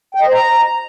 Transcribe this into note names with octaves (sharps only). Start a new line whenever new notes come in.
G5
D#5
C5
A#5